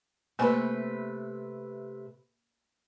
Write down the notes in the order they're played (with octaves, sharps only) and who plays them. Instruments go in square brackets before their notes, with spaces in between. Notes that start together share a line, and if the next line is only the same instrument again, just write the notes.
[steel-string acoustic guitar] C3 A3 B4 [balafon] A#3 G#5